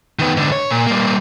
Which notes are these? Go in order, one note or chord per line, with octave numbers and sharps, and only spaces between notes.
D#3 B3
G#2 D3
C#5
A#2
G3 A#3